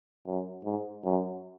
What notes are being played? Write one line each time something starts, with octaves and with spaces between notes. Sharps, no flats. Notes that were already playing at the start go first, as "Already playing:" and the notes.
F#2
G#2
F#2